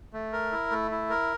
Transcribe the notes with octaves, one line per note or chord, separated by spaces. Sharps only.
A3
A#4
E4
A3
E4
A#4